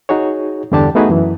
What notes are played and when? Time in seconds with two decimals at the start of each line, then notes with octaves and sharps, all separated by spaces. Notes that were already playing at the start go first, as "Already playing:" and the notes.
0.09 D#4 F#4 G#4 C#5
0.72 E2 G2 D3 D4 G4 A5
0.95 A3 B3 D#4 F#4 G#4 B4
1.09 F#2 E3